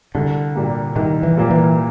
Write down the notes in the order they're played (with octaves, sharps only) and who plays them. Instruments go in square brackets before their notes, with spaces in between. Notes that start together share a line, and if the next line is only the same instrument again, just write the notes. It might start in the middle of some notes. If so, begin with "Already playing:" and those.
[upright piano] C2 [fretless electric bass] D3
[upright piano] A#2 G3 A#3
[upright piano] C2 [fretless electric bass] D#3
[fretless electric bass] E3
[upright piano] A#2 G3 A#3 [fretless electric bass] F3
[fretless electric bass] E3